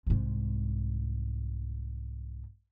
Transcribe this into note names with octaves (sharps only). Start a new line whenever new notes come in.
C2 G#2